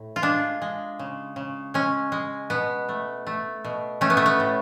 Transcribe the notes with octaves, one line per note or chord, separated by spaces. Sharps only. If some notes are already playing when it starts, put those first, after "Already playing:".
Already playing: A2
F4
G#3 D4
G#3
C#3
C#3
G#3 C#4
G#3
B2 B3
A3
A3
B2
A3 C#4
B3
A3
B3
A2